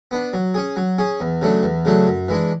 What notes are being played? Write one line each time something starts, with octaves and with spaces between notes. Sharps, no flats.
B3 D4
F#3
C#4 G#4
F#3
C#4 G#4
E2
C#3 F#3 A3 D4
E2
C#3 F#3 A3 D4
F#2
E3 G#3 D4